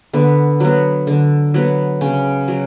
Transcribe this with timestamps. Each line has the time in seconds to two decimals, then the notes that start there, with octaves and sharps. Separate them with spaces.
0.13 D3 B3
0.60 F#3 B3
1.07 D3
1.54 F#3 B3
2.01 C#3 C#4
2.48 F#3